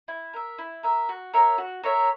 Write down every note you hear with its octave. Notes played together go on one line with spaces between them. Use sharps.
E4
A#4 E5
E4
A#4 E5
F#4
A#4 C#5 E5
F#4
A#4 C#5 E5